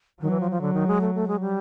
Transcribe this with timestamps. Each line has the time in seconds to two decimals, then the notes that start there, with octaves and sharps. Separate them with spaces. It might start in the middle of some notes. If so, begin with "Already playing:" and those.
0.21 D#3 F#3
0.31 E3
0.40 F3
0.51 F3
0.61 D3 F#3
0.74 D#3
0.87 G#3
1.01 A3
1.15 A3
1.28 G#3
1.41 G3